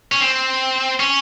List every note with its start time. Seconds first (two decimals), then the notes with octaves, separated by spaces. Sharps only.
0.12 C#4
0.21 C4
1.00 C#4